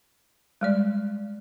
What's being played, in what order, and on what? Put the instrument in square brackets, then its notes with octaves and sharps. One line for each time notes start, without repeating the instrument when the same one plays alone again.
[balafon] G3 G#3 D5